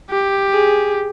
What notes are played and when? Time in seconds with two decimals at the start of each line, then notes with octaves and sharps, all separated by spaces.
0.10 G4
0.52 G#4